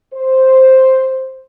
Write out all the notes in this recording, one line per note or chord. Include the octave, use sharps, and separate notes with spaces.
C5